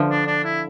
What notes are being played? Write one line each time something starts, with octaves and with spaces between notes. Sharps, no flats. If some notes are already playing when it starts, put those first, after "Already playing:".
Already playing: D3 F3
D4
D4
E4